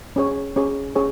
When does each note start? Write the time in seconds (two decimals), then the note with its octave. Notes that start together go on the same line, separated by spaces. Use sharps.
0.16 C#4 G#4 C#5
0.56 C#4 G#4 C#5
0.96 C#4 G#4 C#5